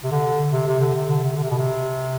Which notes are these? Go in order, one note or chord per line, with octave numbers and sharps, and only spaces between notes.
C3
D3
C3
C3
D3
C3
D3
C3
D3
C3
B2
C3